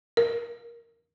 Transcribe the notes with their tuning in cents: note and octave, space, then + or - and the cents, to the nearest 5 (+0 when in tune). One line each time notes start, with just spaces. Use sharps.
A#4 +15